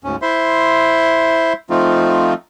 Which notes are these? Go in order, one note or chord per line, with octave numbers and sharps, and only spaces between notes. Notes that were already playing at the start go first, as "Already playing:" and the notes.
D2 G#2 C#4
E4 C5 E5 C6
F3 A3 C4 D#4 F4